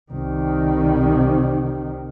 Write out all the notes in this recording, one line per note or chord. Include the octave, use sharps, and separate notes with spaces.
C2 D#3